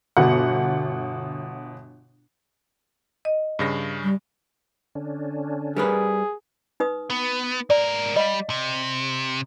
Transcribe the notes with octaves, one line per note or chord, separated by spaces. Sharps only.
G1 B2 F#5
D#5
G2 C#3 A#6
G3
D3 C#4 D4
G3 G#4 A#4 B4
D#4 B4 D#6
B3
G#2 A#4 D5
G3 D#5 F5
C3